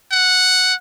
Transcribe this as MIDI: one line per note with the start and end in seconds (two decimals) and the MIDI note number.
0.12 0.74 78